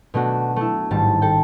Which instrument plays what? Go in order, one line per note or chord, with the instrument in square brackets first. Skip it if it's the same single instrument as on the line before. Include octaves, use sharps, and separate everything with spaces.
[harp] B2 A3 D4 F#4
A3 E4
A1 G#2 D#3 G3 A5
A4 G5